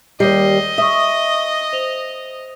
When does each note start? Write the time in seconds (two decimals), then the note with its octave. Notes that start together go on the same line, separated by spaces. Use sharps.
0.20 D#2 G3 D#5 C7
0.78 E5 C#6 D#6
1.73 C5 F7